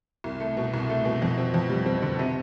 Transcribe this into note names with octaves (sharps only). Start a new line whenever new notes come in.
C2
A3
B2
C2
A3
B2
F2
C4
F2
G3
C4
D3
C3